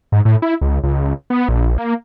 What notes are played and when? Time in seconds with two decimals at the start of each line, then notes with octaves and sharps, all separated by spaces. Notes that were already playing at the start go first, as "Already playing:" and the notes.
0.12 G#2
0.25 A2
0.42 E4
0.61 C#2
0.83 C#2
1.30 B3
1.49 A#1
1.78 A#3